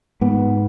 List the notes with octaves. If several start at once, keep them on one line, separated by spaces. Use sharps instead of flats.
G#2 B3